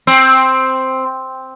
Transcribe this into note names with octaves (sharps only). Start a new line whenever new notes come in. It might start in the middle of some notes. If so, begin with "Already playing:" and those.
C4